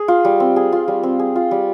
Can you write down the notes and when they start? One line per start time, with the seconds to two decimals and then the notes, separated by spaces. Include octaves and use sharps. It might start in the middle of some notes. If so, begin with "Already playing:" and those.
Already playing: G#4
0.08 F4
0.25 G3
0.40 C4
0.56 G#4
0.72 F4
0.88 G3
1.03 C4
1.19 G#4
1.36 F4
1.51 G3